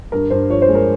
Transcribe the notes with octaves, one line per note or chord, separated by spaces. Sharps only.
G2 A#4
G2 C5
F3 C#5
C5
G#3
A#4